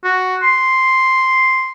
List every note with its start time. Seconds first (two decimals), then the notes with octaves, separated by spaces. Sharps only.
0.04 F#4
0.42 C6